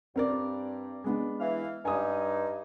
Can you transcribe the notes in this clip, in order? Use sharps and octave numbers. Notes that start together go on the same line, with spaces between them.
G2 C4 A#4 D5
G#3 B3 D4
E3 F5
G2 D#4 G#5 D#6